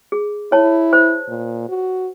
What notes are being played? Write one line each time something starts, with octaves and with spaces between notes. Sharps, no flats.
G#4
E4 C#5 A5
C5
A#2
F#4